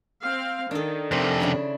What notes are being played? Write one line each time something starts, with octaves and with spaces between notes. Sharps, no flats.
C4 F5
D#3 D4 A4
F2 C3 C4
C#3 D4 E4